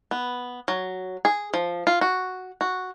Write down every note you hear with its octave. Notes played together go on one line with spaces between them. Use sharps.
B3
F#3
G#4
F3
F4
F#4
F#4